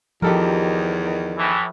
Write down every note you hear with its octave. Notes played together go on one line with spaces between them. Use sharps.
E2 D#3 F3 G4 A4 A#4
A2 E3